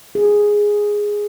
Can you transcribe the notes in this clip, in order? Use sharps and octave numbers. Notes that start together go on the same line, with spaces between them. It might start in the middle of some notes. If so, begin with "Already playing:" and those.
G#4